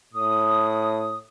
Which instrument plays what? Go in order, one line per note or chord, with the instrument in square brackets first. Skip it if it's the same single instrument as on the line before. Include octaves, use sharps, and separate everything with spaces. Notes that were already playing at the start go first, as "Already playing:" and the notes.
[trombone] A2 [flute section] D#6